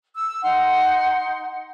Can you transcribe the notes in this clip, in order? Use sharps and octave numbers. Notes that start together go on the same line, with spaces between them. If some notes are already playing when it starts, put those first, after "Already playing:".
E6
D#4 F#5 C6